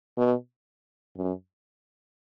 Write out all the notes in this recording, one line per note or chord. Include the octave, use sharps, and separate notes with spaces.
B2
F#2